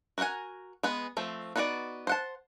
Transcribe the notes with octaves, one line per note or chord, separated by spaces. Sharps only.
F#4 A#4 B4 F#5 G#5
G#3 B3
F3 A3 C4
B3 D#4 F#4 C#5 D5
C5 F#5 A5